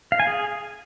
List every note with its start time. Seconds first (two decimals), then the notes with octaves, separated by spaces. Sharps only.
0.12 F5
0.20 G#5
0.27 G#4